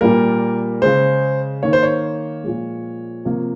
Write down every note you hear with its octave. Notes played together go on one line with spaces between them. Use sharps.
A#2 G3 A#3 A#4
C#3 G#3 C5
D#3 A#3 C#5
C5
C#5
A#2 F3 G#3
C3 F3 A#3